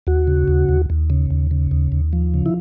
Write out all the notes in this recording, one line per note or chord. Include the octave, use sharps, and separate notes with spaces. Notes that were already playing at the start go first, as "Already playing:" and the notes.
D#2 F#4
C#3
D#2
D#2
D#2
C#3
D#2
C#3
D#2
D#2
F3
C#3
E4